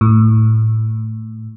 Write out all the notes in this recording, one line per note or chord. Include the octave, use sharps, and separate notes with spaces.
A2